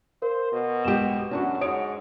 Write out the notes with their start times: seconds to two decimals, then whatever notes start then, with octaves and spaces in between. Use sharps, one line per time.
0.22 A#4 C5 F5
0.52 B2
0.85 B1 G#2 G4 E7
1.31 F#2 C#4 D4 F#4
1.61 G#2 C#5 F#5 D#6 D7